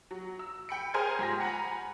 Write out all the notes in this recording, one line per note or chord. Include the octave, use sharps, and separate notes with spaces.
F#3
E6
G5 B5 C#7
G#4 C5 G#5 A#5 F6 G#6
G#2 F3 G4 A#6
F#5 G#5 A#5 B5